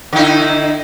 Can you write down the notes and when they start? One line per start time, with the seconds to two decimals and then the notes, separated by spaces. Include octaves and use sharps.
0.13 D3
0.16 D#4
0.19 E4